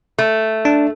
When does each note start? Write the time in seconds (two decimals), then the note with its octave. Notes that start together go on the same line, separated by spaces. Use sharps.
0.18 A3
0.65 D4